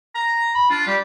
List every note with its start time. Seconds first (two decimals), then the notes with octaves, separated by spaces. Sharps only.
0.15 A#5
0.55 B5
0.70 D4 F4
0.87 G3 G4